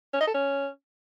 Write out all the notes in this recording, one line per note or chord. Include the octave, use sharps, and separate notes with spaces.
C#4
D#5
A4
C#4